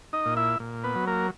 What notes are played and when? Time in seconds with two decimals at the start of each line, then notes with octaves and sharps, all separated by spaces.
0.13 D#4 D#5
0.26 A#2
0.37 E4 E5
0.60 A#2
0.84 B3 B4
0.95 F#3
1.07 A#3 A#4